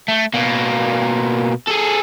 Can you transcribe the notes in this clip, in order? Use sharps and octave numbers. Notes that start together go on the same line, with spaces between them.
A3
B2 A#3
G#4 A4